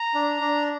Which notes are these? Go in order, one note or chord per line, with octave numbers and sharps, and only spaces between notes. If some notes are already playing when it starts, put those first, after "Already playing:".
Already playing: A#5
D4
D4